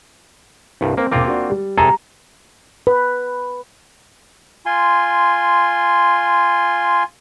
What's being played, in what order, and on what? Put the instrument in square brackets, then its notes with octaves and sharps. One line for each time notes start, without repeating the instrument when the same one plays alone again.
[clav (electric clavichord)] C2 G2
[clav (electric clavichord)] A#3 [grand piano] C4
[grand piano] E1 D6 [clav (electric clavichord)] A#3 C4 F4
[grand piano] D4 F#4
G3
[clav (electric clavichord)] C3 G#4 A4 [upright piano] A#5
[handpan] B4
[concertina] F4 G#5 C6